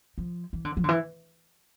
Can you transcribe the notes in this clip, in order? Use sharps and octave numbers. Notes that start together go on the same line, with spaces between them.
F3
E3
D3
F3
D3
E3